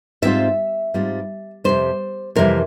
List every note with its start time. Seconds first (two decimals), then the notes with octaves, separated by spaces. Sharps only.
0.22 G#2 G3 C4 F4 E5
0.94 G#2 G3 C4 F4
1.64 F2 C3 E3 G3 C5
2.35 F2 C3 E3 G3 A#4